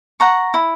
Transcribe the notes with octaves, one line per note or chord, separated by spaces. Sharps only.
F#5 A#5 C#6
E4